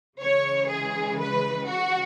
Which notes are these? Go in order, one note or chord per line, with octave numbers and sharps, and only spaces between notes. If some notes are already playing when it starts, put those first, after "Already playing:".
C#3 E3 G#3 C#5
G#4
B4
F#4